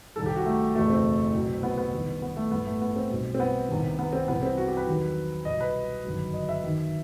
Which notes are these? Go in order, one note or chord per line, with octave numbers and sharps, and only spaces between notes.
C2 C3 D#3 G3 A4
G4
F#4
A3
F#1 E2 B2 A3
C4
C2 B2 F#3
B3
B3
C2 C3 D#3 G3
B3
A3
A1 G2 E3 G3 B3
A3
B3
C4
B1 B2 G3
C4
B3
C2 C3 D#3
B3
C4
C2 C3 E3 G3 B3
C4
F#4
G4
B4
E2 D#3 F#3
C2 B2 G3 D#5
B4
G1 F#2 D#3 F#3
D#5
E5
D#2 D#3 F#3